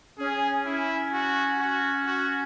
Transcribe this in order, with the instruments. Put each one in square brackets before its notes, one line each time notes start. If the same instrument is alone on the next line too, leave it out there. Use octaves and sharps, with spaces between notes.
[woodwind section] C#4 [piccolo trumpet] G#4
[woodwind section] C#4 [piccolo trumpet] E4
[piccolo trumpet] F#4
F#4
F#4